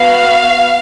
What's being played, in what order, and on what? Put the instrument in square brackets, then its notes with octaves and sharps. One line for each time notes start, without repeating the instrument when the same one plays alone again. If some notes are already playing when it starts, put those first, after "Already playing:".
Already playing: [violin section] B3 F#4 F5